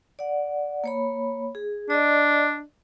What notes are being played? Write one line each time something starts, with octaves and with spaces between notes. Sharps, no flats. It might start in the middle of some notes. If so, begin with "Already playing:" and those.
D5 F#5
A#3 C#5 B5
G#4
D4 D5 D#5